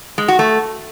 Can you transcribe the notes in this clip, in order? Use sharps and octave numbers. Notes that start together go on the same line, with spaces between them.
G#3
F#4
A3